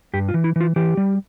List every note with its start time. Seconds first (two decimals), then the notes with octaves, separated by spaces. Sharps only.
0.14 G2 G4
0.29 F4
0.34 E3
0.44 E4
0.56 E3 F4
0.76 E3 G4
0.97 G3